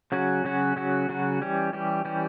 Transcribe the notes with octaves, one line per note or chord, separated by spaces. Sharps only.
C#3 F#3 C#4 F#4
C#3 F#3 C#4 F#4
C#3 F#3 C#4 F#4
C#3 F#3 C#4 F#4
E3 G3 C#4 G4
E3 G3 C#4 G4
E3 G3 C#4 G4